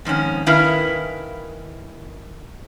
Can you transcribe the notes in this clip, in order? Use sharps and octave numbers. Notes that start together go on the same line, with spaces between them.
F2 G#2 D#3 C#4
D#3 C#4 E4 A#4 B4 F5